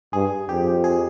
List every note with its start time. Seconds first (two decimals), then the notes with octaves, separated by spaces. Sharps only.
0.13 G2 G#4
0.49 F2 G4
0.84 G#4